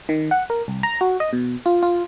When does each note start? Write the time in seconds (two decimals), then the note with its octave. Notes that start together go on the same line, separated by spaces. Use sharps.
0.09 D#3
0.31 F#5
0.50 A#4
0.68 C2
0.83 A#5
1.01 F#4
1.20 D#5
1.33 B2
1.66 F4
1.83 F4